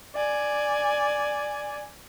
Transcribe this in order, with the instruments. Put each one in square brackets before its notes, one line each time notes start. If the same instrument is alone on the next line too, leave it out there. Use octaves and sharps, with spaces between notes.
[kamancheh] D5 G#5